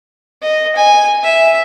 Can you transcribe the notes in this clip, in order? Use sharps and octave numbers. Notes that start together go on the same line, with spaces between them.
D#5
G#5
E5